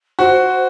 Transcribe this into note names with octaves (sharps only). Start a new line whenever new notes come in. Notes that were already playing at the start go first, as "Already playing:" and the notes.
F#4 C5